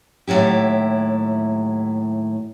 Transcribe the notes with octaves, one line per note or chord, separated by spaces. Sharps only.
D#2 A2 F#3 E4 G4